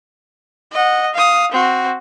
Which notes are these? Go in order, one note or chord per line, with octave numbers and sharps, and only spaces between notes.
D#5 F#5
F5 D#6
C4 F#4